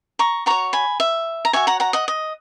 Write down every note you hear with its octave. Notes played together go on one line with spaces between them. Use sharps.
A#5 C#6
F#4 C#5 A#5 C#6
G#5 B5
E5
A#5
F#4 C#5 E5 G#5
F#5 A#5
F#5 A#5
D#5 F#5
D#5